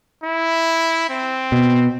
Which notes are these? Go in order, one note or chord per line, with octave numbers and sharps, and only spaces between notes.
E4
C4
B2